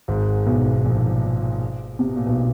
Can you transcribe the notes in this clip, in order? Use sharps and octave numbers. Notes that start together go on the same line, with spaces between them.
G#1 G#2
B1 B2
A#1 A#2
C3
B2
A#2
B1 B2